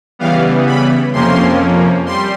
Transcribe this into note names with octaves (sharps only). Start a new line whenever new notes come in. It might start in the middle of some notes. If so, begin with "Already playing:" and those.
C#3 E3 G3 B3 F5
B5
F2 C3 F3 A#3 C#4 C6
G3 C6